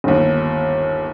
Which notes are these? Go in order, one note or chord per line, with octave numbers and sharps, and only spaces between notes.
G1 D#2